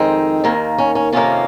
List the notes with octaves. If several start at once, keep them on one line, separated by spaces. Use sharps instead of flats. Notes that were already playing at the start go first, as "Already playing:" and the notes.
Already playing: F2 D#3 G#3 C4 D#4
D#2 D#3 A#3
C#4
C#4
F2 C3 D#3 A#3 C#4 F4